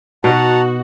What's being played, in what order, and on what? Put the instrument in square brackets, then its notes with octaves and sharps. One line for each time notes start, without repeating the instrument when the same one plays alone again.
[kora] B2 D#4 D#5 [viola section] F#4 [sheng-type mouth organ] F#5 A5 A#5